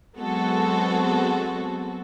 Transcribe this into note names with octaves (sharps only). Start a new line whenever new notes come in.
F#3 G#3 B3 C4 F#4 A4